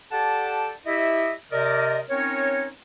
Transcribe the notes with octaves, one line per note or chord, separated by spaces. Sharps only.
G4 A4 D5 F#5 A5
E4 G4 D#5 E5
C3 A#4 D5 D#5
C4 C#4 D#4 A#4 C#5